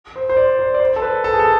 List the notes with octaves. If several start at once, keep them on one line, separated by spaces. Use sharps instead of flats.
C5
C5
D5
C5
D5
C5
A4
B4
A4
G#4
A4